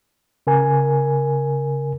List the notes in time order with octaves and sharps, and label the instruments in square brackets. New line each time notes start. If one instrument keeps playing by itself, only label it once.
[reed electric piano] C#3 A#4 G#5